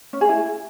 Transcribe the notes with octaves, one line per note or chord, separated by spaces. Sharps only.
C#4
G#4
E4